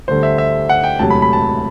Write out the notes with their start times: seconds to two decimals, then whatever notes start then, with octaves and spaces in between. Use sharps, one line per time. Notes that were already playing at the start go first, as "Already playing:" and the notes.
0.08 D2 D3 G3 C5
0.23 E5
0.38 E5
0.69 F#5
0.83 G5
0.99 E1 D2 C3 F#3 A5
1.10 B5
1.22 B5
1.33 A5